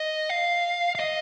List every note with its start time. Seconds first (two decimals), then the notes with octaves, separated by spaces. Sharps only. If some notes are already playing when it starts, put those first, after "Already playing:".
Already playing: D#5
0.29 F5
0.95 F5
1.00 D#5